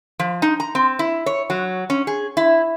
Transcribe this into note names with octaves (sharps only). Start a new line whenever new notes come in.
F3
D#4
A#5
C4
E4
C#5
F#3
C#4
G#4
E4